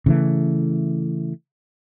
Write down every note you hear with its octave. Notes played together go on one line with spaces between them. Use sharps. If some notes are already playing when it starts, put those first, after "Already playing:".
C#3 E3 A3